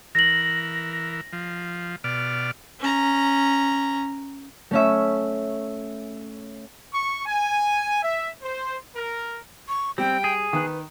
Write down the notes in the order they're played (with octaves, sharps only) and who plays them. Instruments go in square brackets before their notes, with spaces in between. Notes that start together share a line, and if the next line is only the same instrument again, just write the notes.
[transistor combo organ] E3 A#4 [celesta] A#6 F#7
[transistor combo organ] F3
B2 D5 F6
[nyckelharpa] C#4 A#5
[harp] A3 C#4 E5
[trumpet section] C#6
G#5
E5
C5
A#4
[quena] C#6
[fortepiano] G3 [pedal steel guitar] C4 [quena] G5
[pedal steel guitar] G#4
[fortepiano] D#3 F#6 [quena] B4